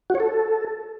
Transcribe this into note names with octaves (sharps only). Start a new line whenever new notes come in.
F#4
C#5
A4